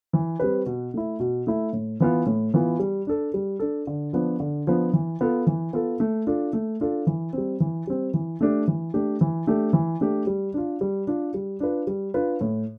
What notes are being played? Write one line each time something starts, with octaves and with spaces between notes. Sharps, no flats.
E3
G3 C4 G4 B4
B2
A3 E4
B2
A3 E4
A2
E3 B3 F4
A2
E3 B3 F4
G3
D4 A4
G3
D4 A4
D3
F3 B3 D4
D3
F3 B3 D4
E3
B3 F4 A4
E3
B3 F4 A4
A3
D4 F4 A4
A3
D4 F4 A4
E3
G3 C4
E3
G3 C4
E3
A3 D4 G4
E3
A3 D4 G4
E3
A3 D4 G4
E3
A3 D4 G4
G3
D4 F4
G3
D4 F4
G3
D4 F4 B4
G3
D4 F4 B4
A2